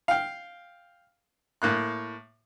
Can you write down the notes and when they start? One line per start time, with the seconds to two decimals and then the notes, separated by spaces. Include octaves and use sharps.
0.08 F5 G5
1.62 A2 A#3 F#6